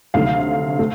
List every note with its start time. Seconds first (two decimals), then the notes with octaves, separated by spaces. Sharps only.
0.14 D2 C3 D#3 F#3 A3 F5
0.79 A3